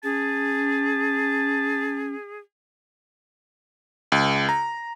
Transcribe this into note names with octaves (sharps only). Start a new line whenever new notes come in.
C#4 G#4 A5
C#2
A#5